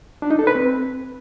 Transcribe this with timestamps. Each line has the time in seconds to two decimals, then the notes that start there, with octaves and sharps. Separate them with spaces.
0.22 D4
0.31 D#4
0.39 A4
0.47 B4
0.55 C4